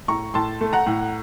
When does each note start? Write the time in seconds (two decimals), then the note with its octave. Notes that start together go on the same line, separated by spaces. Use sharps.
0.08 A2 A#5 C#6
0.34 A2 A5 C6
0.61 A3
0.73 F#5 A#5
0.86 A2